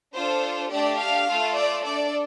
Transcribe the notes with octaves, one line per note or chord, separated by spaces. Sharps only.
D4 F4 A4 C5
A3 D4 G4 D5
F5
A3 F4 A4
D5
D4 A4 D5